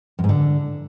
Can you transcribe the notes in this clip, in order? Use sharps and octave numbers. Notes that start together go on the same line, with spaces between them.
F#2
G#2
D3